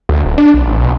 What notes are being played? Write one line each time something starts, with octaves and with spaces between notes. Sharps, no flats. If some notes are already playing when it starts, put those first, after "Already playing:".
D2
D1
D4
B1
A1
B1